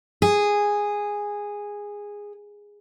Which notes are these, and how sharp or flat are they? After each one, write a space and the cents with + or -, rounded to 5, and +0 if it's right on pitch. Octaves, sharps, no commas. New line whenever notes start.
G#4 -10